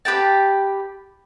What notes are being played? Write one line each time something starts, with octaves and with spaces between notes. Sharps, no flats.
G4 B4 G5 A5